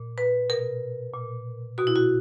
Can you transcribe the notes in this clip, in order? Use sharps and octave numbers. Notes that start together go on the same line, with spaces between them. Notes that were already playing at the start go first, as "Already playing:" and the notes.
Already playing: A#2
B4
B2 A#4
A#2
B2 F#4
E4
F#4